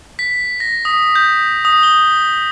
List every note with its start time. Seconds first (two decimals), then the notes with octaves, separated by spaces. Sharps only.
0.19 B6
0.60 A#6
0.85 D#6
1.16 G6
1.65 D#6
1.83 G7